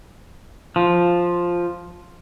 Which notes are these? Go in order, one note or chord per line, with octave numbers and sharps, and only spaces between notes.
F3